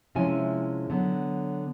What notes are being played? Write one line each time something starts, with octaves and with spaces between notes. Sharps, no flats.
C3 F3 G#3 C#4 E4 G#5
D3 F#3 B3